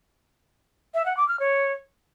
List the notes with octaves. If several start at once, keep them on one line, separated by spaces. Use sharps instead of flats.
E5
F#5
D6
F6
C#5